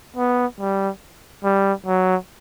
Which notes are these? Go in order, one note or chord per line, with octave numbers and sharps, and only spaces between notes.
B3
G3
G3
F#3